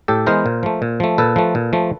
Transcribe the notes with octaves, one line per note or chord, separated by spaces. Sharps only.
A2 G4 A4
E3 G#3 B3 A#4 C5
A#2
F3 A3
A#2
F3 A3
A#2 A4 B4
F3 A3
A#2
F3 A3